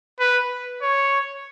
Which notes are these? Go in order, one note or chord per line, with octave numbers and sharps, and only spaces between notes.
B4
C#5